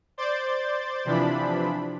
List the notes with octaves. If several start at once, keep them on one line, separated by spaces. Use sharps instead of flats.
C5 D5 G6 A6
C3 E3 F3 D4 B5